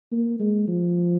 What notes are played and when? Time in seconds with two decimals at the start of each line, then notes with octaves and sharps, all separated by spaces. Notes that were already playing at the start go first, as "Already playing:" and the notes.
0.12 A#3
0.40 G#3
0.68 F3